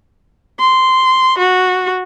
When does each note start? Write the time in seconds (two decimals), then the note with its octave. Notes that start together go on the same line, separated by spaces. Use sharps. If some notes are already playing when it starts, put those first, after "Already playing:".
0.60 C6
1.38 F#4